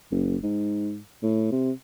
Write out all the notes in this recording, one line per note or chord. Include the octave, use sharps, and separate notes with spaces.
F#1
G#2
A2
C3